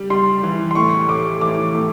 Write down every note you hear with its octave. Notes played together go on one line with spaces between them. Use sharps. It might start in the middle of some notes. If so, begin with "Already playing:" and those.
Already playing: G3
G3 C6
E3
C6
A2 C#6
A2 D6
E3 D6
A2